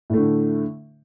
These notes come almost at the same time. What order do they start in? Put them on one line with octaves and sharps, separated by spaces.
A2 A3 D3